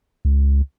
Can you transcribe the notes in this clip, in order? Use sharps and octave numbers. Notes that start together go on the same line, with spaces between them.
C#2